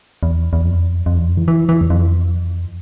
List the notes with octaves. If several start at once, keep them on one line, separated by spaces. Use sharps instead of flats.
E2
E2
F2
F2
E2
F2
E3
E3
E3
E2
F2